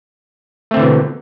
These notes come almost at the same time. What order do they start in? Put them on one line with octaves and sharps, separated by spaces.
A3 C4 D3 E3 B2